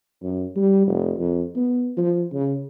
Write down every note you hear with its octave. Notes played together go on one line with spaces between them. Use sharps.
F#2
G3
F1
F2
B3
F3
C#3